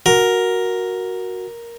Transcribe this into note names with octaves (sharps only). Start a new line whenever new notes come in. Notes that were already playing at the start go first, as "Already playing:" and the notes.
F#4 A#4